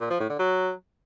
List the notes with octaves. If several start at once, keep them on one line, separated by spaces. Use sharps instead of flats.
A#2
F3
A2
D3
F#3